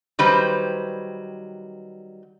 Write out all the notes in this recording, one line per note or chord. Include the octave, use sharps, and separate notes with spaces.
D#3 F#3 G3 B4 C5